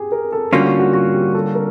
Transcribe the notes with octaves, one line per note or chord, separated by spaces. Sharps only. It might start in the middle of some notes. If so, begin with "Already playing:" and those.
Already playing: G4 G#4
A#4
A4
D3 G3 A#3 C#4 F4 F#4
F#4
F#4
F#4
G4
A4
A#4